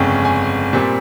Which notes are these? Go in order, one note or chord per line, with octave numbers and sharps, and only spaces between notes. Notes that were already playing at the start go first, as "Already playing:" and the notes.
Already playing: G1 F2 C#3 G#3 C#4 G5
G#5
A#2 G3 C4